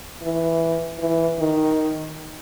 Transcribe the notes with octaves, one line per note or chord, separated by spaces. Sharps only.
E3
E3
D#3